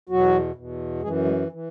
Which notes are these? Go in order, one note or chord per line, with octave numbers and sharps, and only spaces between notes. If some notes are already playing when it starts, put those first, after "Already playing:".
E2 B2 F#3 F#4
E2 B2
F#2 E3 G#3 G#4
G#3
E3